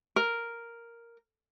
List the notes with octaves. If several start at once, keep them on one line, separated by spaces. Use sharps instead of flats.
A#4